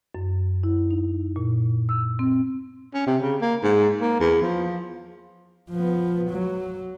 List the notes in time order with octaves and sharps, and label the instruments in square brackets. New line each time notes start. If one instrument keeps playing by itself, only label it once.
[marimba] F#2
E4
D#4
A#2
E6
C4
[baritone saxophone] C#4
C3
C#3
A#3
G#2
A#3
E2
F3
[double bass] F3 B3
F#3